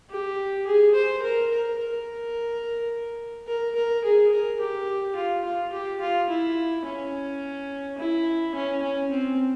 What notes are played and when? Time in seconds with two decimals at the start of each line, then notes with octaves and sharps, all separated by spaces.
0.10 G4
0.67 G#4
0.95 C5
1.23 A#4
1.51 A#4
1.79 A#4
3.48 A#4
3.76 A#4
4.04 G#4
4.32 A#4
4.61 G4
5.16 F4
5.45 F4
5.73 G4
6.01 F4
6.29 E4
6.85 C#4
7.98 E4
8.55 C#4
8.82 C#4
9.11 C4